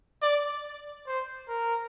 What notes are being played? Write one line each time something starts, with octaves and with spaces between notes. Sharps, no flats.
D5
C5
A#4